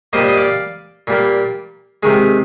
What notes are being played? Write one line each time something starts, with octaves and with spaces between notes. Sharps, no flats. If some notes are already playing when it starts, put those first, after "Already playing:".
A#2 G3 A#3 C5 D#5
D#5
D5 F5
A#2 G3 A#3
C3 D#3 G#3